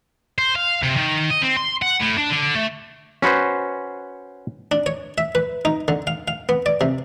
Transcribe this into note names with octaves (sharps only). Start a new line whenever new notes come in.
C5
F5
C3
D#3
D#5
C4
C6
F#5
A2
D4
D3
A3
C#4 F#4 B4 C5
D4
C#5
E5
B4
D#4
D3
F5
F5
B3
D5
C3